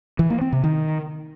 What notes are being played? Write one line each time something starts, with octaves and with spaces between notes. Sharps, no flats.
E3
A#3
C4
C3
D#3